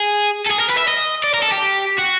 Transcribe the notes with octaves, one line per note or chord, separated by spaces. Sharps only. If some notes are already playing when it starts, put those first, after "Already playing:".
Already playing: G#4
A4
G#4
A#4
B4
E5
D#5
D5
A#4
A4
G4
F#4